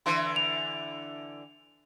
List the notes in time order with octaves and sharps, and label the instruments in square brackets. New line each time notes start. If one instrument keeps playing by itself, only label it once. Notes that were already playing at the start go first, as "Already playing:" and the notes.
[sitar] D3 E3 [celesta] C6
[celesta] F7